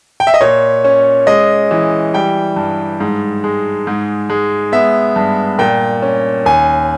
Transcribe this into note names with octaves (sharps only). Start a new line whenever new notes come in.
G5
E5
D#5
A#2 C#5
C#4
G#3 D#5
E3
G3 G5
G2
G#2
G#3
G#2
G#3
B3 E5
G2
A#2 G5
C#4
D#2 G#5